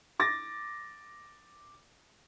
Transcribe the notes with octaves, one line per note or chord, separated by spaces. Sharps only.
D6 A6 A#6